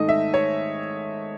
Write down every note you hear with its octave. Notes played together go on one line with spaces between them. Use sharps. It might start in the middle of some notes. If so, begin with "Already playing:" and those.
Already playing: G#2 D#3 A3 D#5
E5
C#5